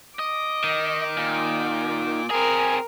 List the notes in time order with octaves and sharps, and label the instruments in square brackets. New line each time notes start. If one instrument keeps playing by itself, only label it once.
[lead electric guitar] D#5 [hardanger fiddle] D6
[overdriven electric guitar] D#3
[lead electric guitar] A#2
[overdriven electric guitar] C4 G#4 [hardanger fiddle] A#4 [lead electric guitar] G#5